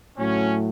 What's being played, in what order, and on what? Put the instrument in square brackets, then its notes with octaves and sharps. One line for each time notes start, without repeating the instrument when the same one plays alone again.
[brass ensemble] A2 F#3 C#4